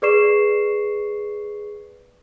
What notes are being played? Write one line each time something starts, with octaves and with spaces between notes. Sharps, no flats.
G#4 B4 D5 C#6 C7 E7